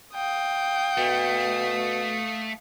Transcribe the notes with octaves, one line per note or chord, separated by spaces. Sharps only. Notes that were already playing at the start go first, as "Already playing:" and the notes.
F5 G5 D#6
B2 A3